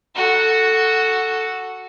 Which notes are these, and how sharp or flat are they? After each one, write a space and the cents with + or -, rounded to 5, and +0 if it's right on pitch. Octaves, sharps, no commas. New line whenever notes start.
F#4 +0 A4 +5